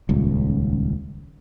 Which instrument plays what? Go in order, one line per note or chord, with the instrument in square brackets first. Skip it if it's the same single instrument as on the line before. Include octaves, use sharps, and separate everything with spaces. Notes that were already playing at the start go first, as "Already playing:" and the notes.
[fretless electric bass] D#1 C#2